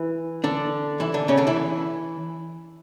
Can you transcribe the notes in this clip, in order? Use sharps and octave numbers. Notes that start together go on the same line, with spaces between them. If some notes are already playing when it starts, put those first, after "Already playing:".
Already playing: E3 E4
D3 D4
E3 E4
D3 D4
C#3 C#4
D3 D4
E3 E4